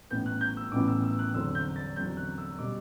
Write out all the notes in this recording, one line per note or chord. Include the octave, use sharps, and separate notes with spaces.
A1 A2 E3 B3 G6
F#6
G6
E6
A1 A2 E3 B3 D6
E6
E6
F#6
E2 D3 F#3 C4 E6
G6
A6
E2 D3 F#3 C4 G6
F#6
E6
B2 G3 D6